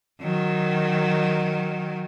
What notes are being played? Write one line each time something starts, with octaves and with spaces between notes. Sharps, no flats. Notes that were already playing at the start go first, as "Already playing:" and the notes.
D#3 F#3